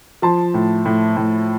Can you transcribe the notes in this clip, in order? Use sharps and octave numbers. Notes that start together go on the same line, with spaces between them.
F3 A5 C6
A2
A2
A2